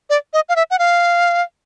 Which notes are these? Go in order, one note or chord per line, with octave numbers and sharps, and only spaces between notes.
D5
D#5
F5
E5
F#5
F5